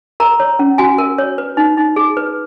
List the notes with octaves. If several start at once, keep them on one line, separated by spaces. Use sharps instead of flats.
A#4 A#5
C#5
C#4
F#4 G#5
A#4
C#5
B4
D#4
D#4
G#4
B4